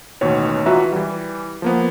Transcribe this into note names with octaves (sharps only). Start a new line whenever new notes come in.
A1 D#2 B2 C#5
E3 F4 F#4 B4 E5 A#5
E3 G3
F3 A#3 B3